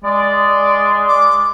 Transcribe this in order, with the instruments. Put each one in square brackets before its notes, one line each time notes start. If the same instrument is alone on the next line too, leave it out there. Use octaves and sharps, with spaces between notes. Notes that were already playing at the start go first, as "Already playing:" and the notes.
[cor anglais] G#3 [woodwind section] D5
[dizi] D6